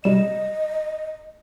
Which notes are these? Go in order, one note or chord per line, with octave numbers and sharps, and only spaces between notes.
C3 G3 D#5 E7